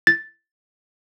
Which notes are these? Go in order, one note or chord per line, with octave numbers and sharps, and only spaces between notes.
A6